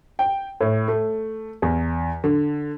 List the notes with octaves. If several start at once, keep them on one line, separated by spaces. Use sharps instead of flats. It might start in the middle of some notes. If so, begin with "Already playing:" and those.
G5
A2
A3
E2
D3